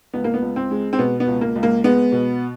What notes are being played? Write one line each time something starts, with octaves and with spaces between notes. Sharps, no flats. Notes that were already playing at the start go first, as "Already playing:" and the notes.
C#2 B3
A#3
B3
C#2
C4
G#3
C4
B2 B3
B3
C#2
A#3
C#2
A#3
G#3 B3
B2